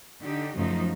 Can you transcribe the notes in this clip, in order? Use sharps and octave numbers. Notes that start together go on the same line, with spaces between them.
D3 D#4 G4
F#2 C#3 F3 A3 D#4